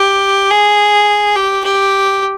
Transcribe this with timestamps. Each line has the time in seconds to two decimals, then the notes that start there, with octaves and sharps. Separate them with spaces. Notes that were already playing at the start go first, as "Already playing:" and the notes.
Already playing: G4
0.50 G#4
1.36 G4
1.64 G4